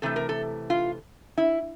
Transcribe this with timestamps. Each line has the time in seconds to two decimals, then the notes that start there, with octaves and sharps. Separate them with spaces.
0.02 C3 E3 A3 A4
0.16 A#4
0.29 A4
0.70 F4
1.38 E4